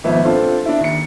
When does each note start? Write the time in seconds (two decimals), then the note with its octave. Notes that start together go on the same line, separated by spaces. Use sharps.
0.04 G#1 F3 B3 E5
0.24 C4 D4 F4 A4 C5
0.66 D4 E4
0.80 D#2 C#7